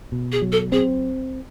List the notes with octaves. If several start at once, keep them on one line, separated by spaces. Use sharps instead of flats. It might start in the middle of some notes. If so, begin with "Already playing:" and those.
B2
G#4
F#3
A4
C4 G#4